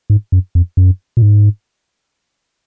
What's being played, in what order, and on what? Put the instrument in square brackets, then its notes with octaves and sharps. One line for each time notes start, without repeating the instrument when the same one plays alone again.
[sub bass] G#2
F#2
F2
F#2
A#2
G#2